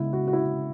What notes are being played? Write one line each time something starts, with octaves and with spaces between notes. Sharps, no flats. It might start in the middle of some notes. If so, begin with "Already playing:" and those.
Already playing: C#3 G#3 B3 E4
F#4
F#4
E4